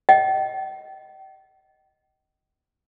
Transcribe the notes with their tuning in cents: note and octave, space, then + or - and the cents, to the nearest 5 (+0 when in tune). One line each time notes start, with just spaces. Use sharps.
D#5 +0 G5 -40